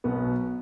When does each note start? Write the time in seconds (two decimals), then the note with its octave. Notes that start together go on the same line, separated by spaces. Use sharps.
0.04 B1 B2 B3